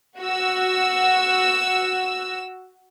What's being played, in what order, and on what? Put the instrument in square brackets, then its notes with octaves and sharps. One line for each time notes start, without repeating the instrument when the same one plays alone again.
[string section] F#4 E6